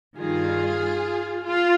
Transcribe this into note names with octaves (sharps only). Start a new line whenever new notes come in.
G2 D#3 G3 F4 G#4
F4